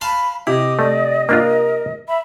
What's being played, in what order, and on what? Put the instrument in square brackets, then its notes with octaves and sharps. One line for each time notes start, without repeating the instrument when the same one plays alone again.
[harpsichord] F5 A5 C6 [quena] B5
[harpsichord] C3 [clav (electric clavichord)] E4 [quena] D#5 [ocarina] D6
[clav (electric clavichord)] A3 [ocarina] D5
[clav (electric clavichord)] A#3 D4 F4 [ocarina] A#4
[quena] E5 [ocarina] B5